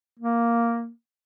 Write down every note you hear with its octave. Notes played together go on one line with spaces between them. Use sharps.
A#3